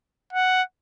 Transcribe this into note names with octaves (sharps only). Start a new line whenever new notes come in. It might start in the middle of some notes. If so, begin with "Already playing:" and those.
F#5